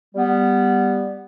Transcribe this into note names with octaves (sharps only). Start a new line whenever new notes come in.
G3 B3